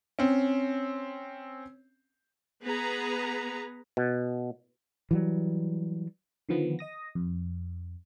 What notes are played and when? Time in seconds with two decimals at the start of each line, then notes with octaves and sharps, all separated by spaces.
0.19 C4 C#4
2.63 B3 G#4 B4 A#5
3.97 B2
5.11 E3 F#3 G3
6.49 D3 D#3 F3 B3
6.79 D#5 D#6 A#6
7.15 F2